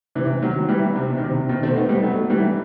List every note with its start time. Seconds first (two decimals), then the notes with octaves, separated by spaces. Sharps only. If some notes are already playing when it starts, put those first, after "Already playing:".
0.15 C3 E3
0.42 D#3 F#3
0.69 E3 G3
0.96 C3
1.09 B2
1.18 D#3
1.23 C3
1.36 C3
1.49 B2 D#3
1.63 A3 C4
1.76 B3 D#4
1.89 G3 B3
2.03 F#3 A3
2.30 E3 G3